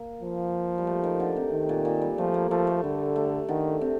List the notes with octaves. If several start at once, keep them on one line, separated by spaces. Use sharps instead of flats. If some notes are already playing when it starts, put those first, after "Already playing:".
Already playing: A#3
F3
G3
A3
D#3
D3
C3
D#3
A#2
A#2
G3
F3 A3
A#3
F3 A3
A3
D3 G3
A3
D3 D#3
C3